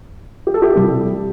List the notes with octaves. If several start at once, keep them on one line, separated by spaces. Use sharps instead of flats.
G4
A4
E4 G4
C3 E3 G3